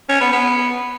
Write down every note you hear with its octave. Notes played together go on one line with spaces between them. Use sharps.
C#4
B3
B3